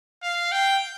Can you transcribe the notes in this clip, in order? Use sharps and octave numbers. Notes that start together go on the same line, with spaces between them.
F5
G5